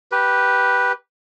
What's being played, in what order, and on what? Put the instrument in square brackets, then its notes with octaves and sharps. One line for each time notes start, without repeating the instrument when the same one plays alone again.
[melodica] G4 B4